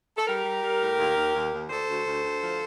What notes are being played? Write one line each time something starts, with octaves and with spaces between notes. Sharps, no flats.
A4
G3 G4 A#4
G3
G3
A2
D#2
D#2
D#2
D#2
D2 A4 C5
D2
D2
D2
F3